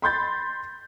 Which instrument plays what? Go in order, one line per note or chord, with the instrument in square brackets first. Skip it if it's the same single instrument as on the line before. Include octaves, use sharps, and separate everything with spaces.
[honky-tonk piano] B5 C6 G6 A6